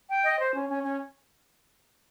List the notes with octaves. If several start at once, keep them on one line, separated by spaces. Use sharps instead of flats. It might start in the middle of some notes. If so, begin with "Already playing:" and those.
G5
D#5
C5
C#4
C#4
C#4